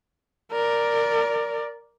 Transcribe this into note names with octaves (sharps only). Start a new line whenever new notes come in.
A#4 D5